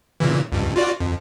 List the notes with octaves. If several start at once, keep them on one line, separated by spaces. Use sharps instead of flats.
A#2 C#3 E3
C#2 G2
F4 F#4 D5
F2